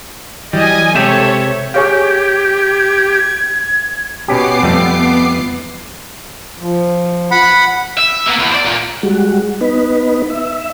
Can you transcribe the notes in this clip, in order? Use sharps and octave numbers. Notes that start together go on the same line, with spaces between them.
E3 F#3 G3 D#5 G#5
C3 G#3 G4 A4 C#5 E5
G4 G#4 C#5 F5
G#6
B2 B3 C#4 G4 D6 C7
F2 G3 A3
F3
F#5 B5
E5
A#3 B3
E2
C5 D5
A#2
G3 G#3 F#4
B3 D#4 B4
E5